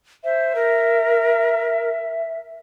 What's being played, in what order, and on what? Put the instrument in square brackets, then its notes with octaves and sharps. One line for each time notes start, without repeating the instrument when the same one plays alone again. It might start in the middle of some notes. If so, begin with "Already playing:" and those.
[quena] C5 [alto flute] E5
[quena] A#4